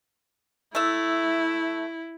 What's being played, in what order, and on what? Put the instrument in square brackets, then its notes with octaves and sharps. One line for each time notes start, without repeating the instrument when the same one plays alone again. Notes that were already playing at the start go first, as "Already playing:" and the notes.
[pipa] A3 E5 [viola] E4